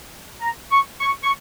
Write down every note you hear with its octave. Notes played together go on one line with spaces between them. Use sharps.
A#5
C#6
C#6
C#6